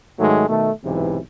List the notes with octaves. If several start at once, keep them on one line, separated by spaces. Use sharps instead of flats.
G#2 D#3 F#3 G#3 A3
B2 D#3 A3
B1 G#2 C3 E3